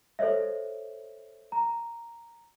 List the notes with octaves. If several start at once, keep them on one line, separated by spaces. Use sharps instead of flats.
A4 C5 C#5 D#5 E5
A#5